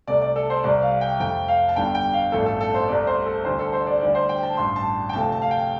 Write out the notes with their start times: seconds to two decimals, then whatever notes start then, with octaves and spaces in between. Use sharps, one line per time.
0.07 C2 C3 A3 D5
0.22 D5
0.36 A4
0.50 C5
0.64 C2 C3 G3 D5
0.82 F5
1.01 G5
1.19 F2 F3 A3 G5
1.48 F5
1.69 A5
1.76 G1 G2 D3 G3 G5
1.95 G5
2.14 F5
2.32 A1 G2 F3 A3 A4
2.46 A4
2.61 A4
2.74 C5
2.88 C2 C3 A3 D5
3.07 C5
3.26 A4
3.44 D2 D3 G3 C5
3.59 A4
3.73 C5
3.87 D5
4.01 D2 D3 G3 D5
4.15 C5
4.29 G5
4.43 A5
4.57 A1 G2 G3 C6
4.76 A5
5.09 G5
5.13 D2 C3 F3 A3 A5
5.32 A5
5.42 F5
5.51 G5